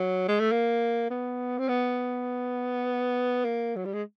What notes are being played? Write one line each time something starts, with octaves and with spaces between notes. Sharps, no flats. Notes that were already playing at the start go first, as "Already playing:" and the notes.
Already playing: F#3
G#3
A3
A#3
B3
C4
B3
A#3
F#3
G3
G#3